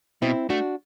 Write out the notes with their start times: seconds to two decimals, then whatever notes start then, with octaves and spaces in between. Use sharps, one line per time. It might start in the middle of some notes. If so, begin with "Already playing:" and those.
0.22 B2 C4 E4
0.50 A3 D4 F#4